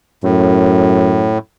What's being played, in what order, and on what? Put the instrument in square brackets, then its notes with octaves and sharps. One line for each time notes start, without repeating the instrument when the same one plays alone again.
[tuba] F#2 [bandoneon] A2